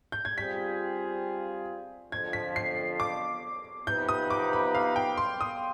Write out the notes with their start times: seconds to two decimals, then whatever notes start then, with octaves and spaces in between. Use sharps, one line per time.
0.12 G6
0.25 G#6
0.37 G3 C4 F4 G#4 B6
2.12 F2 D3 F3 G#6
2.33 B6
2.56 C7
3.00 D6
3.87 C3 F3 B3 D#4 B4 G6
4.09 D#6
4.30 D6
4.53 B5
4.75 F5
4.96 G5
5.17 C6
5.41 D#6